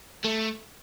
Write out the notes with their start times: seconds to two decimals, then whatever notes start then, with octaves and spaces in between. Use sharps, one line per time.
0.24 A3